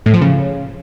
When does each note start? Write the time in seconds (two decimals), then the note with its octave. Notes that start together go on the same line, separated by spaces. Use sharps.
0.06 A2
0.14 F3
0.21 C#3